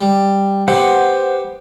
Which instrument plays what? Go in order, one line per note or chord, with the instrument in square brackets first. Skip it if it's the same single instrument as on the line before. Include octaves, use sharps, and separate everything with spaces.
[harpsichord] G3
[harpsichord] B3 G4 [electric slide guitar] C5 F#5